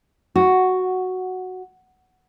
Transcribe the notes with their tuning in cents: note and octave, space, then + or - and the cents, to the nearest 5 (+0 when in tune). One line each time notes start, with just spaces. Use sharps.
F#4 +0